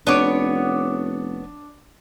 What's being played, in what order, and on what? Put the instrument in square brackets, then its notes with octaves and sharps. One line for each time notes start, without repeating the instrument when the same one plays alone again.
[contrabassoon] F1 [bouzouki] B3 C#5 [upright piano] D4 D6 D7